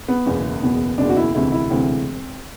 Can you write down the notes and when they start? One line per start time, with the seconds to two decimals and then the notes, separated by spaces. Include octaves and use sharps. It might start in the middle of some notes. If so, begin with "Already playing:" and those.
0.08 B3
0.26 F#1 E2 B2
0.62 F#1 E2 B2
0.98 F#1 E2 B2 D4
1.10 F#4
1.17 E4
1.35 E1 D2 C3 E3 E4
1.52 E4
1.70 E1 D2 C3 E3 C4